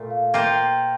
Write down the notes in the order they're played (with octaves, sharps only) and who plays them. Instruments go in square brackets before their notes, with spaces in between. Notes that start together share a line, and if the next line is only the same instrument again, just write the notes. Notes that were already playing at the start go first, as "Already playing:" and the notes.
Already playing: [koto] A#2 A3
[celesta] F5
[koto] A#3 F4 C5 [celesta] G5
[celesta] G5